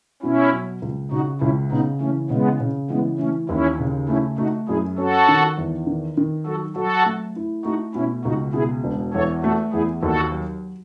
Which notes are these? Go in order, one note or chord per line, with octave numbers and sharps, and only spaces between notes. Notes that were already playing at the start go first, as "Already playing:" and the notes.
B2 C#4 E4
F#3
C#2
C#3 D#4 F#4
C#2 C#4 E4
C#3 B3 D#4
E3 A3 C#4
C#3 G#3 B3
C#3
E3 G#3 B3
E3 A3 C#4
D#2 C#4 E4
C#3
A3 C#4 E4
A3 D#4 F#4
F#2 E4 G#4
C#4 F#4 A4
D#3
E2
D#3
D#3
F#3 F#4 A4
F#3 F#4 A4
A3
E4
A3 D#4 F#4
B2 C#4 E4
C#2 D#4 F#4
B2 E4 G#4
E1
E2 A4 C#5
A3 F#4 A4
E2 E4 G#4
D#2 F#4 A4
F#3